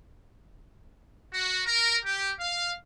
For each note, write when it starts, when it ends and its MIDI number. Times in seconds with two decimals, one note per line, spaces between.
1.33 1.60 66
1.66 1.96 70
2.04 2.31 67
2.39 2.72 77